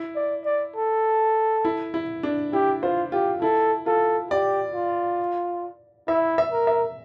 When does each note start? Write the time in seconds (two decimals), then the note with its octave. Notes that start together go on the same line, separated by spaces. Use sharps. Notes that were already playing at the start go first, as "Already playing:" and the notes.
Already playing: E4
0.16 D5
0.45 D5
0.76 A4
1.65 E4
1.94 E4
2.23 D4
2.53 E4 G4
2.82 F4 C5
3.12 F4 G4
3.42 E4 A4
3.86 F4 A4
4.30 G4 D5
4.75 F4
6.08 E4 E5
6.38 E5
6.52 A#4
6.67 E5